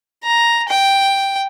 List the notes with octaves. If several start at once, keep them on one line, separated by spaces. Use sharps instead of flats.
A#5
G5